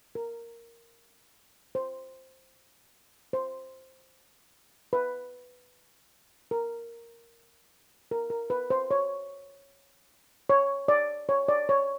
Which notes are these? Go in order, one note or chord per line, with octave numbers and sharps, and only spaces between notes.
A#4
C5
C5
B4
A#4
A#4
A#4
B4
C5
C#5
C#5
D5
C#5
D5
C#5